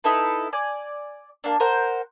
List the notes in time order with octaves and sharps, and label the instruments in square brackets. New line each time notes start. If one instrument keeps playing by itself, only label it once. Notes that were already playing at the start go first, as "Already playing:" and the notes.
[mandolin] D#4 E4 A4 B4
D5 G#5
A#3 D4
A#4 C5 F#5